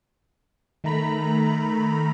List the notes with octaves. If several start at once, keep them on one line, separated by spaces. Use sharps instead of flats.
D#3 A3 A#5 B5